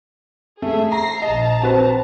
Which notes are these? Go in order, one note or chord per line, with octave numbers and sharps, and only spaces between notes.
A3 G#4 E5
A#5 A#6 C7
A#1 D#5 A5 A#5
C4 F#4 B4